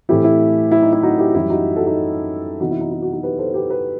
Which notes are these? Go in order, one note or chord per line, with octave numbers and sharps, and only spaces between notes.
A2 E3 A3 C4 E4 G4
E4
E4
D#4
E4
D#4 F#4
E4 G4
F#2 E3 G3 E4 G4
D#4 F#4
F#4 A4
D#4 F#4
C3 E3 B3 D#4 F#4
E4
D#4
E4
D#4 F#4
D#4 F#4
G4 B4
A4 C5
G4 B4
G4 B4